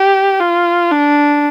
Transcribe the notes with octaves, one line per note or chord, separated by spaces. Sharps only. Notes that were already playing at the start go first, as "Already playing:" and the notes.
Already playing: G4
F4
D4